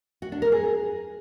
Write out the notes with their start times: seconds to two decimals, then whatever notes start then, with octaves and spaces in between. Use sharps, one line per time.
0.22 F#4
0.32 D4
0.42 A#4
0.52 G#4